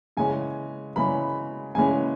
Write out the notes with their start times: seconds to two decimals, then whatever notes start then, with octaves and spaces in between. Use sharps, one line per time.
0.17 C#3 E3 G#3 C#4 G#5
0.96 C#3 E3 G#3 C#4 B5
1.75 C#3 E3 G#3 C#4 G#5